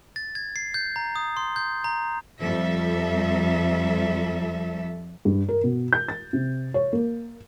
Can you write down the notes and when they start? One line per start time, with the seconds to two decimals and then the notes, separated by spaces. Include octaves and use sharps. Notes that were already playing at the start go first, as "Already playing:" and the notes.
0.16 A6
0.35 G#6
0.56 C7
0.74 G6
0.96 A#5
1.16 D#6
1.37 C6
1.56 G6
1.84 A#5
2.42 F2 F3 G3 A4 E5
5.25 G2
5.49 A#4
5.64 B2
5.93 G6
6.08 A6
6.33 C3
6.74 C#5
6.93 A#3